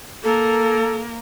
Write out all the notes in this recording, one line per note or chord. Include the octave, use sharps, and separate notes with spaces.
A#3 A4 A#4